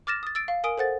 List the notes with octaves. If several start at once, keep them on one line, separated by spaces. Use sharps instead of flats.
D6 F6 A6 A#6 E7
D#6 A6
E6 A6 D7
F5
A#4 G#5 D#6 D7
A4 C5 F#5 A6